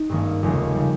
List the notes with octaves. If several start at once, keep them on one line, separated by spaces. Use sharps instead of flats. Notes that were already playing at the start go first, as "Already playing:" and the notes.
Already playing: D#4
G#1 G2 D#3 A#3 C#4
F1 D#2 C#3 G#3 C#4
C#3 G3